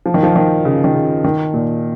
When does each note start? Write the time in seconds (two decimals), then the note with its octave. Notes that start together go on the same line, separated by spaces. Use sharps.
0.06 F3
0.14 D#3
0.23 F3
0.36 D#3
0.65 C#3
0.84 D#3
0.94 C#3
1.24 D#3
1.54 A#2